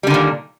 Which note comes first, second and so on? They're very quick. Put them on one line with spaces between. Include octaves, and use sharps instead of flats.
G3 D3 D#3 A#2